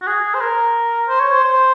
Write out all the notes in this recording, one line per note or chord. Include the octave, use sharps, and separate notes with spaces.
F#4
G#4
C5
A#4
C5
C#5
C5
C5